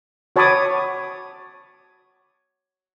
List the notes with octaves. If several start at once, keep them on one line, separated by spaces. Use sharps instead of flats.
F#4 C#5 A5 B5 D6 D#6